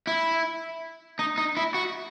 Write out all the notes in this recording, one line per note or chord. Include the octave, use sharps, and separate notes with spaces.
E4
D#4
D#4
E4
F#4